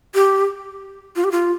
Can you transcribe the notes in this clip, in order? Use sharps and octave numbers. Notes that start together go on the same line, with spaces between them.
G4
F4
G4
F4